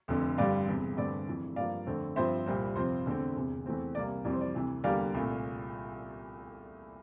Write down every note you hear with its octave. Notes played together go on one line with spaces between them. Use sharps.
F1 F2 D3
G2 D3 G3 D5 F5
E1 E2 C3
G2 D3 A3 C4 D5
F1 F2 E3
G2 F3 A#3 D5 F5
F2 D3 A3 C4
G2 F3 C4 C5 E5
C2 A#2 G3 C4
F2 C3 F3 C4 C5
E2 D3 A3 C4
E1 E2 C3
E2 E3 A3 C4
C2 C3 G3 A#3 D5
F2 C3 E3 G3 D5
C5
D5
D2 C3 E3
E2 D3 G3 A#3 D5 F5
C2 A#2 A3